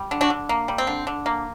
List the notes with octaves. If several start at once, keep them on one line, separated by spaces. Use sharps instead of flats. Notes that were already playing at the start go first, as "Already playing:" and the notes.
Already playing: G3
D3
D4 F#4
D3
A#3
G3
C4
D3
D3
A#3